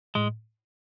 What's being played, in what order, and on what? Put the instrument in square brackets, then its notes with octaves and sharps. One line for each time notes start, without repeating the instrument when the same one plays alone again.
[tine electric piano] A2 [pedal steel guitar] G#3